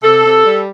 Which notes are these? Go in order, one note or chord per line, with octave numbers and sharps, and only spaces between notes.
C3 A4
C3
G3